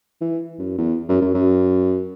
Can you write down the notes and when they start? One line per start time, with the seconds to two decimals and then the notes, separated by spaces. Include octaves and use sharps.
0.21 E3
0.59 F#2
0.78 E2
1.09 F#2
1.21 F#2
1.34 F#2